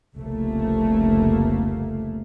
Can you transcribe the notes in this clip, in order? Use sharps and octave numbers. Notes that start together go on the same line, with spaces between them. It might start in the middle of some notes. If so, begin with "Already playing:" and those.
F1 C2 C#3 A3 A#3